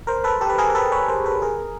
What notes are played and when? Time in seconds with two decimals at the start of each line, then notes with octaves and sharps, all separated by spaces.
0.07 A#4 C5
0.24 A4 B4
0.41 G4 A4
0.50 B4
0.58 G#4 A#4
0.70 A#4
0.75 A4 B4
0.92 B4 C#5
1.08 A#4 C5
1.26 A4 B4
1.42 G#4 A#4